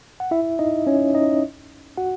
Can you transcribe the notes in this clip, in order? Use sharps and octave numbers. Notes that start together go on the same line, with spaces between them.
F#5
E4 E5
D#4 D#5
C#4 C#5
D#4 D#5
F#4 F#5